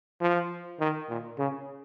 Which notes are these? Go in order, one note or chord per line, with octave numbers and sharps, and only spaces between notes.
F3
D#3
A#2
C#3